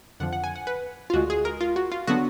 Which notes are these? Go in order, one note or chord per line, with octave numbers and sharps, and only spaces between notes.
F2 D3 F3 F#5
F#5
G#5
F#5
B4
F4
D2 D3 G#3 F#4
G#4
A#4
F4
F#4
F4
D3 F#3 B3 D4 F#4